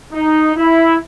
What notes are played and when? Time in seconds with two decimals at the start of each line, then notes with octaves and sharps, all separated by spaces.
0.13 D#4
0.56 E4